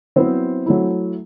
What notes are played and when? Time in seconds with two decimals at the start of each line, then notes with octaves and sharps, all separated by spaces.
0.16 F#3 B3 C4 E4 C5
0.66 F#3 A3 E4